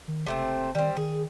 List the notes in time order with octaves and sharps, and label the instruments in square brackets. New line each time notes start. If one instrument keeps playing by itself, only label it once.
[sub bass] D#3
[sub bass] F#1 [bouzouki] C3 A3 C4
[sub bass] D#3 [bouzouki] G3 C4
[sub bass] D#3 [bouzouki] G#4